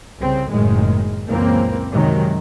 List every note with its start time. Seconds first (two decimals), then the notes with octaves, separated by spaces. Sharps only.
0.20 C2 C#3 C4
0.50 F#1 A2 D#3 G#3
1.27 C#2 F#2 A#2 E3 A#3 C4
1.92 F#2 C3 D#3 F#3 G#3